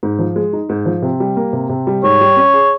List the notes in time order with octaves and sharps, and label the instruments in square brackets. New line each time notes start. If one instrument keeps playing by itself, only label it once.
[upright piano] G#2
F3
G#3
D#4
G#2
F3
C3
G3
A#3
C3
C3
G3
[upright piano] G#2 [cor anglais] C#5
[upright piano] G3
C#4
G#4